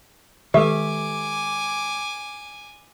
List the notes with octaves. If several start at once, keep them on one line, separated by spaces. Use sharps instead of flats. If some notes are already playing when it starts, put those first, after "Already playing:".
D#3 G#3 G4 A4 B4 E5 G#5 D6